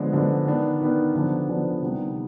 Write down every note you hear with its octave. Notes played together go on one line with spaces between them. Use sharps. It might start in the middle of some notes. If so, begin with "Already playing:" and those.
Already playing: D3 F3 G#3 B3 D4
D3 F3 G#3 B3 D4
D#3 B3 D4
D#3 B3 D4
D3 F3 B3 D4
D3 F3 B3 D4
C3 D#3 G3 B3